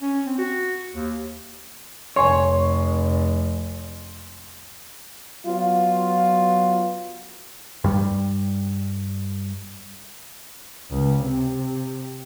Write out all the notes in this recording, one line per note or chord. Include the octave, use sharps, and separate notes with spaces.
C#4
C4
F#4
D#2
F1 C#5 G#5 C6
F#3 B3 F4
G2 G3
C#2
C3